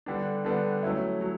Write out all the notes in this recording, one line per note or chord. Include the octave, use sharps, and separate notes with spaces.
D3 G3 B3 D4
D3 G3 B3 D4
F#3 A3 C#4 E4
F#3